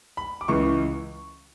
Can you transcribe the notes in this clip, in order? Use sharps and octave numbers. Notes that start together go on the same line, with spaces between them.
B5
D6
C#2 C#3 E3 C#6